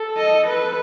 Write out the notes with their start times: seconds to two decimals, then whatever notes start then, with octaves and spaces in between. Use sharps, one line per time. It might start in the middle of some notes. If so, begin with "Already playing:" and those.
Already playing: A4
0.17 D#5
0.47 B4